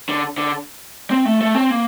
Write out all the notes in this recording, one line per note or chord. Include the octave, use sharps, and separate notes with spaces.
D3
D3
C4
A3
A3
C4
A#3